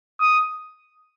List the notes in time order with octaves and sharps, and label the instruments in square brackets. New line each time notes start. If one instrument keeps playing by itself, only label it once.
[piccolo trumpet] D#6